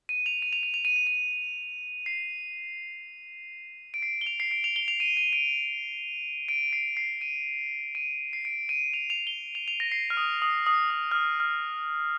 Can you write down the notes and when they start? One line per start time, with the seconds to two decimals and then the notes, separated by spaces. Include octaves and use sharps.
0.09 D#7
0.26 F7
0.42 D#7
0.53 F7
0.63 D#7
0.74 F7
0.85 D#7
0.96 F7
1.07 D#7
2.06 C7
3.94 D7
4.02 C7
4.21 G7
4.26 F7
4.40 C7
4.51 D7
4.64 F7
4.76 G7
4.88 F7
5.00 D#7
5.17 D#7
5.33 D7
6.49 D7
6.73 C7
6.97 C7
7.21 D#7
7.95 D#7
8.33 C7
8.45 D7
8.69 D#7
8.94 F7
9.10 F7
9.27 G7
9.55 F7
9.68 F7
9.80 A#6
9.92 C7
10.10 F6
10.17 D#6
10.42 D#6
10.67 D#6
10.90 D#6
11.11 F6
11.15 D#6
11.40 F6